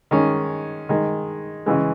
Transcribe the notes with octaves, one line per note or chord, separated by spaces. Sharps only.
D#3 G#3 C#4
D#3 G#3
C#3 E3 G#3